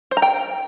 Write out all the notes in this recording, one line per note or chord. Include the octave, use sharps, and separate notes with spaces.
C5
A#5
G5